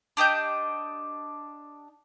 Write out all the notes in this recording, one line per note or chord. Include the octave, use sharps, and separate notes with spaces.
D4 G4 D#5 G6